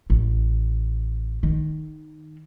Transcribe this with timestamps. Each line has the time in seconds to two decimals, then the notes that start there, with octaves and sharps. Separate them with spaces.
0.10 A1
1.43 D#3